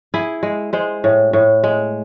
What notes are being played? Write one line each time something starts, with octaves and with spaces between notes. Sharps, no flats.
E4 G#4
G#3
G#3 C5
A2
A2
G#3